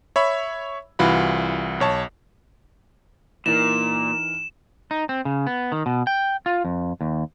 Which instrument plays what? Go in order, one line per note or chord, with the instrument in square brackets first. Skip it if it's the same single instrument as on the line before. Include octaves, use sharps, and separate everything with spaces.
[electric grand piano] C#5 E5 B5
C2 E3 F4 F#4 B5
B1 C#5 A5
[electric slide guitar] A#2 [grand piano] E3 D#4 A#4 [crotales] E7
[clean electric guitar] D#4
C4
C#3
B3
D#3
B2
G5
F4
F2
D#2